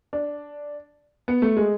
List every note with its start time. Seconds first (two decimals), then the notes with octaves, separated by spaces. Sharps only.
0.13 D4
1.28 B3
1.42 A3
1.57 G#3